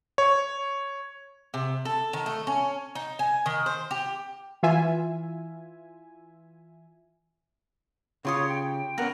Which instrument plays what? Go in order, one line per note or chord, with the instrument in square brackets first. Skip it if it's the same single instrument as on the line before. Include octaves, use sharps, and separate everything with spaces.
[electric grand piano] C#5
[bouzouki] C3
A4
D#3
A3
C#4
D#4
G#5
D#3
C5
G4
[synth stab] E3 F4 E5 G#5
[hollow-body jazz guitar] C#3 F4 [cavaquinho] G4 C6 D#6 [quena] C#5
[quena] G5
[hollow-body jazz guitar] A#3 B3 C#4 [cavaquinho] A#4 F#5